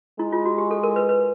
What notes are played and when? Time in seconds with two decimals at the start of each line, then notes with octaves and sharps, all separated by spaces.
0.19 G#3 E4
0.32 F4
0.45 F#4
0.58 G4
0.71 A4
0.83 A#4
0.96 B4
1.09 B4